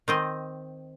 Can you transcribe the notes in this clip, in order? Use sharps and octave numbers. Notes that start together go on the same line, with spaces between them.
D#3 C4 D#5